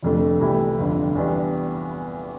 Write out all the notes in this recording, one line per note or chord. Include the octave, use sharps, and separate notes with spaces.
F1 F2 D3 A3
C2 C3 E3 A3 E4
G1 F2 D3
E2 E3 G3 D4